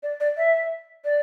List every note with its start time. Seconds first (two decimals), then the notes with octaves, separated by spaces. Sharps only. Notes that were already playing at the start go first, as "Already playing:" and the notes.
0.03 D5
0.20 D5
0.37 E5
1.05 D5